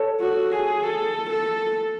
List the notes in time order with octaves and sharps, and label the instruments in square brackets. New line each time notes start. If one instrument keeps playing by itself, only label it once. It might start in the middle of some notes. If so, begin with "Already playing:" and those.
Already playing: [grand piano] A4 C#5
[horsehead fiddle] F#4
G#4
A4
A4